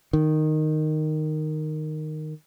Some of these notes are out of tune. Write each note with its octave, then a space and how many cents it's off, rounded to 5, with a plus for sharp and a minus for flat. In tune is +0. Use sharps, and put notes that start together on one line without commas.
D#3 -10